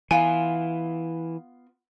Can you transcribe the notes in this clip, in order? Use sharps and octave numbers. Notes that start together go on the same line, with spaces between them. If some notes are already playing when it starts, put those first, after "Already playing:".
E3 B3 F4 G#5